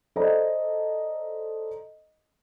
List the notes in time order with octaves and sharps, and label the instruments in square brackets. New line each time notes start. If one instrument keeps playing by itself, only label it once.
[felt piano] A4 C5 D5 D#5 A#5